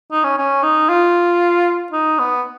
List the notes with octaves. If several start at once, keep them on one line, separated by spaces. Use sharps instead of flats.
D#4
C#4
C#4
D#4
F4
D#4
B3